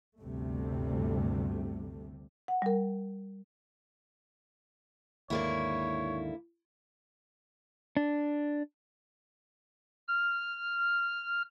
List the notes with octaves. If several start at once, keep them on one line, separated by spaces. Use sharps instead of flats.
G1 D2 C3 G3 A3
F#5
G3 A#4
D#2 G#2 D3 A#3 E4 C#5
D4
F6